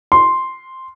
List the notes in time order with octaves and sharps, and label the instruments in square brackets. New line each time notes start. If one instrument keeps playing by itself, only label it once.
[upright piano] C6